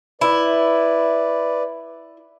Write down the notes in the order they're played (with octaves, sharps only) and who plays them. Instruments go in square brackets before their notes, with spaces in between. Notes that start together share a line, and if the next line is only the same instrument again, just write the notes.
[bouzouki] E4 [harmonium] B4 D5